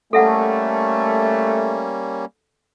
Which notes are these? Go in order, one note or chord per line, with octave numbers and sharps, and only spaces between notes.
G3 A3 A#3 C#4 A4 E5 F#5